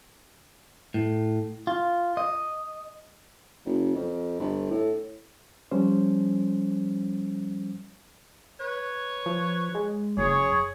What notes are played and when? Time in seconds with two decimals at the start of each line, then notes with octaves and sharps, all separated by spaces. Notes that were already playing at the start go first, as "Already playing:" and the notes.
0.94 A2
1.67 F4
2.17 D#5
3.66 F#1
3.95 F2
4.39 G1
4.70 A2
5.71 F3 G3 C#4 C5
8.60 B4 C#5
9.26 F3
9.75 G#3
10.18 F#1 G#4 C#5